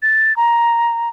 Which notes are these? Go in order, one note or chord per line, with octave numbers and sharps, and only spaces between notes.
A6
A#5